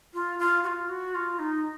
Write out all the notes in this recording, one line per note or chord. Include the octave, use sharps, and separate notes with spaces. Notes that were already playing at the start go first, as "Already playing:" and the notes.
F4
F4
F#4
F4
F#4
F4
D#4